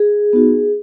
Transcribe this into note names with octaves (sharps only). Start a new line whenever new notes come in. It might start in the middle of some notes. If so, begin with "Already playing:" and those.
Already playing: G#4
B3 D#4 F#4